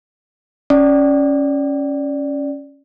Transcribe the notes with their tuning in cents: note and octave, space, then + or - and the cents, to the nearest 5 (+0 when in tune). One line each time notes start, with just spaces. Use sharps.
C#4 +0 D5 +0